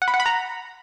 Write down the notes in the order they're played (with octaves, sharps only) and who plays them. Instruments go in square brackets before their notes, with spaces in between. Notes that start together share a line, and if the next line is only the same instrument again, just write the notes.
[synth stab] F#5
B5
F#5
B5
A#5